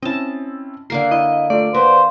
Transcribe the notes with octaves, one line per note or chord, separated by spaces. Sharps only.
C4 C#4 E4 D#5 A5
D3 A#3 A#4 C7
E4 D#5
A3 F4 D5
A#3 B4 C5 F#5